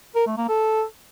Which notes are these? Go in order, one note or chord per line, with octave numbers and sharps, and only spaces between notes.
A#4
A3
A#3
A4